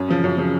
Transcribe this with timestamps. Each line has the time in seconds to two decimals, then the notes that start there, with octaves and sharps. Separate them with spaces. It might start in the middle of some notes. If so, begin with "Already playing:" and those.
Already playing: F#2
0.09 C#3 F3
0.24 F#2
0.38 C#3 F3